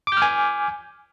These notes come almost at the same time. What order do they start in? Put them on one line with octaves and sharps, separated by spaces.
D6 G6 F6 G#5